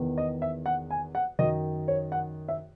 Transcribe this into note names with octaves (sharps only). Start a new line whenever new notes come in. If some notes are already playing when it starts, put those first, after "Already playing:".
Already playing: E2 D#3
D#5
E5
F#5
G#5
F#5
F#2 D#3 D#5
C#5
F#5
E5